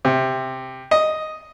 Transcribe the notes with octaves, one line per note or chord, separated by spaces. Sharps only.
C3
D#5